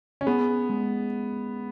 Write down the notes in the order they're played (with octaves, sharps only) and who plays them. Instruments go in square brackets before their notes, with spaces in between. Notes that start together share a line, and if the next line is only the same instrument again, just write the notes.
[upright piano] C#4
[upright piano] B3 [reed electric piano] G#4
[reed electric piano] G#3